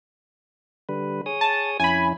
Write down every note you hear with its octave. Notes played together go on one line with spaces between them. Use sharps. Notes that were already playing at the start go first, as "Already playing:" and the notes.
D3 G3 B4
G#4 C#5 D#6
A5
F2 C#4 E4 G#5 B5